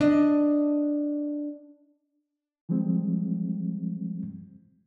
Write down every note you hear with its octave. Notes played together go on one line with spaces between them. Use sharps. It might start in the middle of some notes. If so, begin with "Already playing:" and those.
D4 D#5
E3 F3 G3 G#3 C4